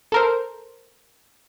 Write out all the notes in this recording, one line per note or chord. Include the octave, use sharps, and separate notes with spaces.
A4 A#4 C5